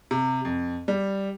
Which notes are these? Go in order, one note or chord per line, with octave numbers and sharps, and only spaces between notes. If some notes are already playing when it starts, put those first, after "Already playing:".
C3
F2
G3